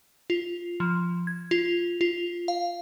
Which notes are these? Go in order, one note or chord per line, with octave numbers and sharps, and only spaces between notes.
F4
F3
G#6
F4
F4
F5